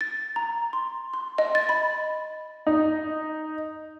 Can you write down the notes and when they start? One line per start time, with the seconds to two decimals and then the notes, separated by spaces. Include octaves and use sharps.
0.01 A6
0.36 A#5
0.73 C6
1.14 C6
1.38 D#5
1.55 A6
1.69 B5
2.67 D#4